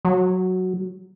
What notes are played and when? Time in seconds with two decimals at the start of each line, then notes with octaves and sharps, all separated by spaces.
0.05 F#3